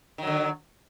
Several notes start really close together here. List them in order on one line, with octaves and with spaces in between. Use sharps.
D#3 F#3 D3